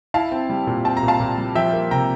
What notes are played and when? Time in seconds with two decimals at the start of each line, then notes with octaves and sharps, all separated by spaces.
0.14 E4 F5 A5
0.32 C4
0.50 G3
0.67 A#2
0.85 C4 A5
0.97 A#5
1.03 A#2
1.08 F5 A5
1.20 A#2
1.38 G3
1.55 F3 E5 G5
1.73 A#3
1.91 C3 G5 A#5